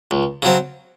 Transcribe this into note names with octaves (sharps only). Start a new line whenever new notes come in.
C#2
C#3 F#3 C4